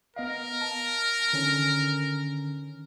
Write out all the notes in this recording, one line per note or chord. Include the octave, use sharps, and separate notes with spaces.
B3 A#4 D#5 F5
A5
D3 D#3 C#4